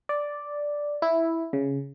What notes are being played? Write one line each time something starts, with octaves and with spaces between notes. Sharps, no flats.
D5
E4
C#3